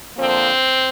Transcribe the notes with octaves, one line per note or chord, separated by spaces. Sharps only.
D3 F3 A#3 C4